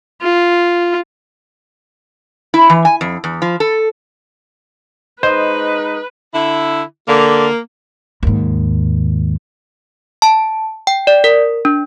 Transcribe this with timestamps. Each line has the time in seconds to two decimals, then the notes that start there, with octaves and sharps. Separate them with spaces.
0.22 F4
2.54 E4
2.70 E3
2.85 G#5
3.01 F2
3.24 E2
3.42 F3
3.60 A4
5.23 G#3 D#4 B4 C5 D#5
6.35 D3 E4
7.08 D3 A#3
8.23 D#2 G#2
10.22 A5
10.87 G5
11.07 D5
11.24 A#4
11.65 D4